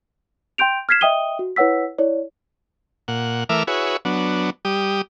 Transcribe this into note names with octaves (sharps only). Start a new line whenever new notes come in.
G5 C6 G6 D7 F7
F6 G#6 B6 C7 E7
D#5 E5 G5 D#6 D#7 G7
F#4
E4 B4 C#5 F#5 E6 B6
E4 C#5 D5
A#2 F#5
E3 A3 A#4 E5 D6 F6
E4 F#4 G#4 B4 C#5
F#3 B3 D4
G3 G4 D#6